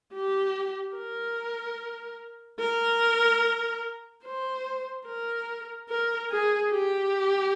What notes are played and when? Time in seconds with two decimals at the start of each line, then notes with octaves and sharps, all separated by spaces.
0.14 G4
0.96 A#4
2.60 A#4
4.25 C5
5.07 A#4
5.89 A#4
6.30 G#4
6.71 G4